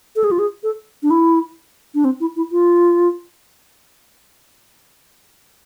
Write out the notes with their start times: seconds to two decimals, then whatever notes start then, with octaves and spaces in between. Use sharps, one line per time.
0.16 A4
0.24 G#4
0.31 F4
0.39 G#4
0.63 A4
1.03 D4
1.11 E4
1.95 D4
2.05 C4
2.20 E4
2.36 E4
2.52 F4